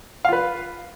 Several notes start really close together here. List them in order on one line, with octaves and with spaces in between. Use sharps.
F5 F4 B4